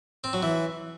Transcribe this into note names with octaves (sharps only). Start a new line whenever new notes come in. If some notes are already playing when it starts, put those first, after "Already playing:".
C4
F#3
E3